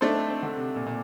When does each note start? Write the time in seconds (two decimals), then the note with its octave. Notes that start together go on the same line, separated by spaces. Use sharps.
0.01 A3 D4 D#4 A4 C5
0.15 C4
0.29 C4
0.43 D3
0.57 C3
0.76 A#2
0.86 A#2